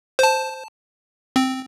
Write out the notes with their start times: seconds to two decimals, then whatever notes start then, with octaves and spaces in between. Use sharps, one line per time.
0.19 C5 A5
1.36 C4